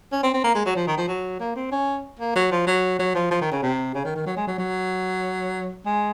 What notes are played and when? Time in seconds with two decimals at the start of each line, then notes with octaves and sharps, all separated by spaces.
0.12 C#4
0.23 C4
0.34 C4
0.44 A#3
0.55 G#3
0.66 F#3
0.76 F3
0.87 D#3
0.98 F3
1.08 F#3
1.40 A#3
1.56 C4
1.72 C#4
2.19 A#3
2.36 F#3
2.52 F3
2.67 F#3
3.00 F#3
3.15 F3
3.31 F3
3.42 D#3
3.52 C#3
3.63 C3
3.95 C#3
4.05 D#3
4.16 D#3
4.27 F#3
4.37 G#3
4.47 F#3
4.59 F#3
5.86 G#3